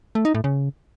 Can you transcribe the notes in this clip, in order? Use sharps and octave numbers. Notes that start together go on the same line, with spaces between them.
A3
D#4
A2
C#3